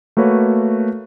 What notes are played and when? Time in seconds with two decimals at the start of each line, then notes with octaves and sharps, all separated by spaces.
0.17 A3 A#3 F#4 B4 C#5